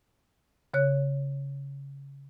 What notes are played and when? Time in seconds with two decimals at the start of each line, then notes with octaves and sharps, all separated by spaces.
0.74 C#3 C#5 F#6